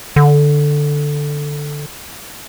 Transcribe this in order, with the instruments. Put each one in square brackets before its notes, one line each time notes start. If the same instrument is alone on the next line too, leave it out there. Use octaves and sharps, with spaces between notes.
[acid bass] D3